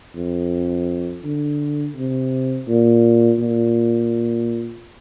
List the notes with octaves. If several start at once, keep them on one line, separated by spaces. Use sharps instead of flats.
F2
D3
C3
A#2
A#2